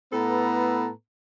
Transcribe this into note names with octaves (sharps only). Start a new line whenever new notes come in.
A2 B3 A4 B4 A#5